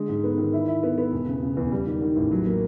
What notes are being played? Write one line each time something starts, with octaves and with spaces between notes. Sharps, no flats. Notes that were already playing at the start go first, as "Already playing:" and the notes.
Already playing: D3 G#3
G#2
B3
D#3
E4
E4
B3
B3
E1
C#3
C#3
E2
G3
D#3
D#3
A1
F#3
A#3